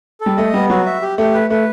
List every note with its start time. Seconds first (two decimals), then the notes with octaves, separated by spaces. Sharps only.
0.21 A4
0.26 G3
0.37 A3 D#5
0.54 G3 B3
0.70 F#3 F#4
0.86 E5
1.02 G4
1.18 A3 G4
1.34 B4
1.50 A3 B4